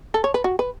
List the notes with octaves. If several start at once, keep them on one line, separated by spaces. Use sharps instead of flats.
A4
C#5
B4
F#4
B4